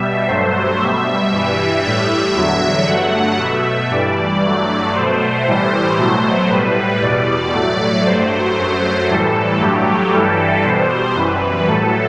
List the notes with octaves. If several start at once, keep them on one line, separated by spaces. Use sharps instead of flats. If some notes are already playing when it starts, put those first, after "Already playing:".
Already playing: B2 G3 E5
G2 F#3 A3 C5
B2 G3 E5
G2 E3 G3
A2 G3 E5
E2 D3 F#3
G2 F#3 A3 F#5
B2 A3 E5
G2 E3 G3 D5
G2 F#3 A3
B2 A3 C5
A2 E3 G3
B2 F#3 A3
A2 G3 B4
E2 B2 G3 D5
A2 F#3 A3
G2 F#3 A3 C5
F#2 F#3 A3
A2 E3 G3 A4
G2 F#3 A3 G4
G2 E3 G3 A4
B2 G3 C5
F#2 E3 G3 B4
A2 F#3 A3 A4